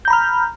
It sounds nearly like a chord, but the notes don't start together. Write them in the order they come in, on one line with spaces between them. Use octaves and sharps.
G6 A#5 B5 F6